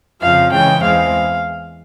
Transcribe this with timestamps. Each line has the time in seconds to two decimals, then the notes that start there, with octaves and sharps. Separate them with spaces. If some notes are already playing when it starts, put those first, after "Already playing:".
0.21 F2 C#3 F3 F5
0.51 C#3 E3 G#3 C#4 G5
0.82 E2 E3 G#3 C4 F5